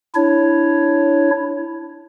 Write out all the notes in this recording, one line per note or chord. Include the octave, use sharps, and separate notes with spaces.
D4 E4 C#5